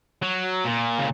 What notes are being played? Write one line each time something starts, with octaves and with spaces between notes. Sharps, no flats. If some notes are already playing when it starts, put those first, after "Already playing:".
F#3
A#2
C#3